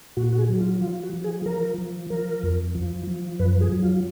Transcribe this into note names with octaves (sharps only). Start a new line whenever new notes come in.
A#2 F#4
F#4
G#4
F#3
F4
F3 F4
F#4
F3
G#4
F3 A#4
F3
F3 A#4
F2
F3
F3
F#2 B4
G#4
F#3
F4